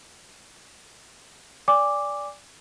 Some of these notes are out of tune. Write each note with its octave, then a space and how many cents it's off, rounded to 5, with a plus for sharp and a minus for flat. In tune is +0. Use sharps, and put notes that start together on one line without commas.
D5 -15 G#5 -30 D6 +0